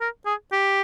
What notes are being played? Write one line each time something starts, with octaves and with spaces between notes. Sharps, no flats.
A#4
G#4
G4